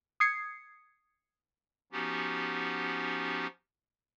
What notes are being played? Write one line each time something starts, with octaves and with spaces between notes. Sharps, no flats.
D#6 G#6 C7 C#7
F3 B3 C#4 D#4 F#4 G4